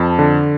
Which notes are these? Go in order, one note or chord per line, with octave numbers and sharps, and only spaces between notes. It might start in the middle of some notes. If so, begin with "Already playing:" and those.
Already playing: F2 A5
D3